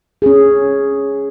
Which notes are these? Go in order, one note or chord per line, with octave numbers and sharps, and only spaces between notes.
C#4 G#4